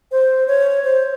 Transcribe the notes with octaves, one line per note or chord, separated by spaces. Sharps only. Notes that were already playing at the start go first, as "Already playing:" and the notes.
C5
C#5
C5